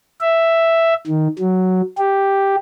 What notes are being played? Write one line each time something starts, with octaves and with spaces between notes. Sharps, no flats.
E5
D#3
F#3
G4